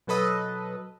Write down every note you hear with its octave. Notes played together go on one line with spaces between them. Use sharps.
B2 F#3 A4 B4 D#5